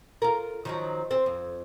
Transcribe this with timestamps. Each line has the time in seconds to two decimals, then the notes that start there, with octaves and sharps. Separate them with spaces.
0.22 F4 A#4
0.65 D#3 F3 F#3
1.11 C4
1.26 F2